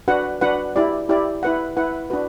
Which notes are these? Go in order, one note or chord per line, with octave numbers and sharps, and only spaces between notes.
D4 F#4 B4 F#5
D4 F#4 B4 F#5
E4 G4 D5
E4 G4 D5
E4 B4 F#5
E4 B4 F#5
D4 F#4 B4